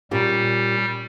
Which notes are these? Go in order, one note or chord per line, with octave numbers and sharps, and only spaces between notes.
A#2 G3 C#4 G4